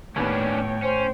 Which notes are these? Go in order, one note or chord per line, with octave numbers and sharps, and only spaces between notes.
D#2 A2 B3 C#4 D4 C#5 G5
C#4 C5